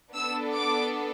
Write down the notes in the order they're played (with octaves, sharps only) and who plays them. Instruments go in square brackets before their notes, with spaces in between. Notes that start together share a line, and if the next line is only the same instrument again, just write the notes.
[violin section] B3 D4 A4 E6
D6